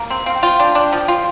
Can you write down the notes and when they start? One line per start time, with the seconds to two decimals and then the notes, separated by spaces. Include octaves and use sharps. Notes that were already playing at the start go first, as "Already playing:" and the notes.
Already playing: A#3
0.10 C4
0.26 C4 F5
0.35 G5
0.43 F4
0.59 D4 G5
0.75 D4
0.93 F3
1.08 F4 G5